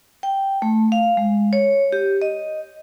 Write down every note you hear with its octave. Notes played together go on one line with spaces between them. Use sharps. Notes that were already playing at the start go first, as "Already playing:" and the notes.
G5
A3
F5
G#3
C#5
G4
D#5